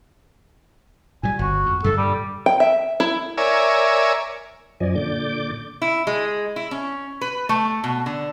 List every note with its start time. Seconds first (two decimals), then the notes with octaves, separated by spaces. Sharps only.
1.23 A#2 G3 G#5
1.39 G1 F#4
1.66 F2
1.84 G2 A#2 D3 A4
1.98 G3
2.46 G5
2.60 E5
3.00 E4
3.38 A#4 C#5 D5 E5 G#5
4.80 F#2 F3 D5 D#5 G#5
4.95 A#2 D3 D5 D6 G6
5.82 E4
6.07 G#3
6.56 E4
6.71 C#4
7.21 B4
7.49 A3
7.84 B2
8.06 D3